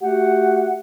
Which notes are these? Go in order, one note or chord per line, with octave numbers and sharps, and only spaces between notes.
A3 F#4 G4 F#5